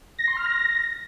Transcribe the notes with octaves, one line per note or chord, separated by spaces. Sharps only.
A#6
C6
F6
A#6